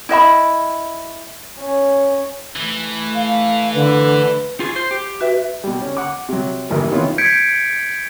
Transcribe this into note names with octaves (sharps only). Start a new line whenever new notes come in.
E4 D#5 E5 B5
C#4
E3 A3
F5
D3 B4
F4 G#4
C5
G4
F#4 B4 E5
B2 G3
C#4
F#5 D6
C3 F#3
A1 G2 E3 A#3
C3 D#3 E3 B3 C#4 F4
G6 G#6 B6 C#7 D7